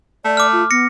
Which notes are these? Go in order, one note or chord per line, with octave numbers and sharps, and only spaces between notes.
A3 D5
D6 F6
F4
B3 A#6 C#7